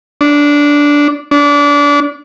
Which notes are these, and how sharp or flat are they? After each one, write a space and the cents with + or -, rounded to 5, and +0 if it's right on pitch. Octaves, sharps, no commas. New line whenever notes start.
D4 -10
D4 -25